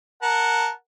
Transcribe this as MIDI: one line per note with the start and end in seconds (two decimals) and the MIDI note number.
0.22 0.70 70
0.22 0.70 78
0.22 0.70 81